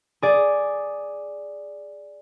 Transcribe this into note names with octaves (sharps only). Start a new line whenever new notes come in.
G#4 D5